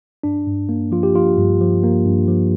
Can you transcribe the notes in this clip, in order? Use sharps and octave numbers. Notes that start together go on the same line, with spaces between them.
G2 D4
G2
A#3
F3 F4
G4
F3 F4
G2
F3
A#3
G2
F3